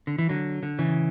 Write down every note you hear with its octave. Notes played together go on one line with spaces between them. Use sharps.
D3
E3
D3 F#3
D3
C#3 E3